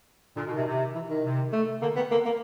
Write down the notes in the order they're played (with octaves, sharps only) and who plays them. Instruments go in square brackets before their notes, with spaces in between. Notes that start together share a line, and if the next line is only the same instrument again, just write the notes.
[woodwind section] A#2 [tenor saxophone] D3
[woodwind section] B2
[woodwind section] C3 [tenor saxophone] D#3
[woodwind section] C3
[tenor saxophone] E3
D#3
[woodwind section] C3
[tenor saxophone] A3
[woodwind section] D3 [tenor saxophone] A#3
[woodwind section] D#3 [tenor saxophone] B3
[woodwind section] D3 [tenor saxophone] A#3
[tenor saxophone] A#3